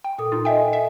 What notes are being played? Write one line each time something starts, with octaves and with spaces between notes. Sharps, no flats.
G5
A#2 A4 D#6
D#4 F4
D#5 E5 G5 G#5
E5